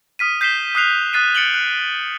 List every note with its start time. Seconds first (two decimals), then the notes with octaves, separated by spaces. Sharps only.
0.19 D#6 F6 B6 D#7
0.41 G6 B6 C7 E7 G7
0.75 D#6 F6 F#6 C7 F7
1.13 D#6 F#6 A6 C7 D#7
1.35 A6 C#7 D7 F#7 G7
1.54 F#6